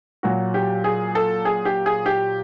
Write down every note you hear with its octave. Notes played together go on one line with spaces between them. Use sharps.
A#2 F#3 F#4
G4
G#4
A4
G#4
G4
G#4
G4